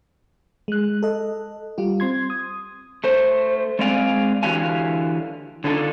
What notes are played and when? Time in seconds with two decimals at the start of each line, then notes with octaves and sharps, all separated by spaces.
0.68 G#3 F#6
1.03 A4 D#5
1.78 G3 F4 G4
2.00 C4 C6 G#6
2.30 D#6
3.04 A3 C5
3.79 G#3 C4 D5 F5 G#5
4.43 D3 E3 F#4 G4 F5 G#5
5.64 D3 D4 D#4 F4 G#4 A4